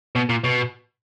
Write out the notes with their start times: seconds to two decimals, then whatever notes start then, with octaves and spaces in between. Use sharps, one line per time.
0.15 B2
0.29 A#2
0.44 B2